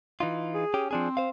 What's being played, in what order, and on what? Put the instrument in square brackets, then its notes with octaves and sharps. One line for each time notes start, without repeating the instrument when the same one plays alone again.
[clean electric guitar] E3 D#4 F4
[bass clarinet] G#4
[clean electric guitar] C#4 G4
[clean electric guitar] F3 D4 G#4 [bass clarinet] C4
[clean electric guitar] C5 F5